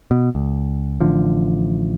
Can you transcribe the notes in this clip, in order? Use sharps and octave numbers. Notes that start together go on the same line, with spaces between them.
B2
C#2
A1 D3 F3